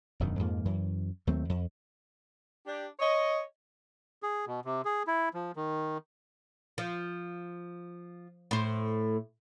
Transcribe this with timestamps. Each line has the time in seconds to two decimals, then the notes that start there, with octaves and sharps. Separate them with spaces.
0.20 E1 F#2 D#3
0.39 F2 G#2 F3 A#3
0.65 F#2 E3
1.27 D#2 F#3 A3 C4
1.49 F2
2.67 D4 G4
3.00 C#5 D#5
4.23 G#4
4.47 B2
4.65 C3
4.85 G#4
5.07 E4
5.34 F3
5.56 D#3
6.78 F3
8.51 A2 C5